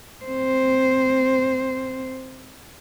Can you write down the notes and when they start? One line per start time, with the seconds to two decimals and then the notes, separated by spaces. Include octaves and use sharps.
0.25 C4 C5